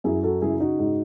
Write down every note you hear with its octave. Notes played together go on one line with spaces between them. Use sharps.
F#2 E4 G#4
F#4 A4
C#3 E4 G#4
D#4 F#4
G#2